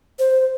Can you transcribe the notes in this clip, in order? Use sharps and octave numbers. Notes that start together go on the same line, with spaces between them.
C5